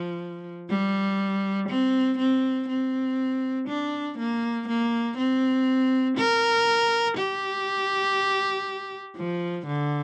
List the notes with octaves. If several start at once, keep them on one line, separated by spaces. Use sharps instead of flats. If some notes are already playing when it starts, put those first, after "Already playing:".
Already playing: F3
G3
C4
C4
C4
D4
A#3
A#3
C4
A#4
G4
F3
D3